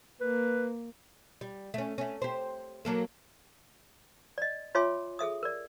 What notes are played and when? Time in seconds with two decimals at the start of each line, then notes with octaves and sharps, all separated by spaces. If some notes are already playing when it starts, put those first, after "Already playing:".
0.21 A#3 B4
1.41 G3
1.74 A3 C#4
1.98 A3 C#4
2.22 G4 C5
2.85 F#3 A#3 A4
4.38 D5 D#5
4.75 F4 C#5 E5 G#5 C6 D6
5.19 G#4 A4 E5 D#6
5.43 A#4 D5